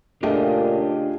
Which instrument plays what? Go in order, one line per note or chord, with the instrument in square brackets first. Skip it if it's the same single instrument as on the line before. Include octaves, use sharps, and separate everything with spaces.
[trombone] A#2 [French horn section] C#3 D4 [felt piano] A3 D#5 [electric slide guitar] F4 G4 G#4